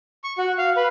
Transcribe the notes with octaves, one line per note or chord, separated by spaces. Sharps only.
C#6
F#4
F5
B4